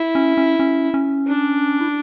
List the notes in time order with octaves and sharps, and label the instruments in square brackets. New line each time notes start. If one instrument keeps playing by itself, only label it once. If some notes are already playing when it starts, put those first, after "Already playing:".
Already playing: [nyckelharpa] E4
[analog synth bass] C#4
C#4
C#4
C#4
[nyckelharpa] D4
[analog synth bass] E4